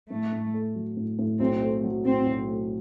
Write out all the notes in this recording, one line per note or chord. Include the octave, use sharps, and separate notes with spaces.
A2 A3
A2
A3
F#3
A2
A2
B1 C4
A3
F#3
A2 C4
B1
A3